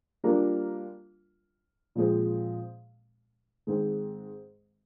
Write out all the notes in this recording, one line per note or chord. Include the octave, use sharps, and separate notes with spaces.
G3 A#3 D4 F4 A#4
A#2 F3 G#3 C4
G#2 D#3 G#3 C4